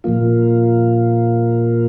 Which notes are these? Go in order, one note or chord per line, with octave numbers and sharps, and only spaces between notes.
A#2 F3 A#3 F4